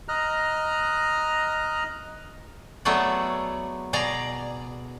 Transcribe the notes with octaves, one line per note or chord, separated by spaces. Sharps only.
D#5 A#5 F6 F#6
F#3 A3 B3 G#4 D5
B2 G#4 D5 A#5